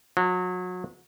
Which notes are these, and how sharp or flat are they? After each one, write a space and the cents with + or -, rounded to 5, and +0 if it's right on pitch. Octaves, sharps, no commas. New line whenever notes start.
F#3 -30